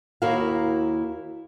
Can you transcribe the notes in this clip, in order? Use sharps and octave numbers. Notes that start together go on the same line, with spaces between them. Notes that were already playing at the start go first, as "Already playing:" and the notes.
D#2 E4 F#4 A#4 F5